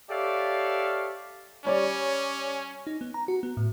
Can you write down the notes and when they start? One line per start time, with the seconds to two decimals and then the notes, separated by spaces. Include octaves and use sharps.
0.11 G4 A4 C#5 D5 E5 F5
1.65 G3 C#4 C#5 D5
2.87 D#4
3.01 B3
3.14 A#5
3.28 F#4
3.43 B3
3.57 A2